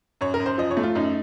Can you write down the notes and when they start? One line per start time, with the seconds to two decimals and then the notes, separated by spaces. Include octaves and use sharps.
0.21 F#2 C#5
0.34 A#4
0.40 F#2
0.46 C5
0.58 F3 D#5
0.71 C#5
0.77 A3
0.83 F4
0.95 F#2 D#4